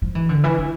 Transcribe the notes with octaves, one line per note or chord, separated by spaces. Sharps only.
F3
E3
D3
E3
E3